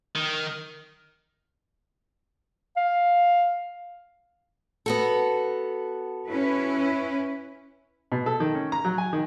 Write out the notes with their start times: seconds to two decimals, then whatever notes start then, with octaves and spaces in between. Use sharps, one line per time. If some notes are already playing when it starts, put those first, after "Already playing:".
0.15 D#3
2.76 F5
4.86 B3 F#4 A4
6.29 C#4 E4 B4
8.12 B2
8.26 A4
8.40 D#3
8.55 C#4
8.72 A#5
8.85 F#3
8.98 G#5
9.13 D#3